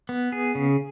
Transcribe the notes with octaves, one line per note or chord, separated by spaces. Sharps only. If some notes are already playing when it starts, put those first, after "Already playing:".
B3
G#4
C#3